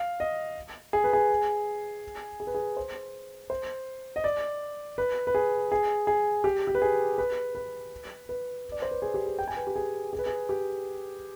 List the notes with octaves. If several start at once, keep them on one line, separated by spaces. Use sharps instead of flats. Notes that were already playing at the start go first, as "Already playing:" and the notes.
Already playing: F5
D#5
G#4
B4
G#4
G#4
B4
G#4
C5
C5
D#5
D5
B4
B4
G#4
G#4
G#4
G4
G4
B4
G#4
B4
B4
B4
D5
C5
B4
G#4
G4
G#4
G5
G#5
B4
G4
G#4
G#4
B4
G#4
G4